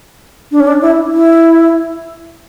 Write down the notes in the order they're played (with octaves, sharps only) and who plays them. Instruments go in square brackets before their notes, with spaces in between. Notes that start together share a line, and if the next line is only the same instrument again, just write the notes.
[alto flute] D4
C#4
D4
E4
E4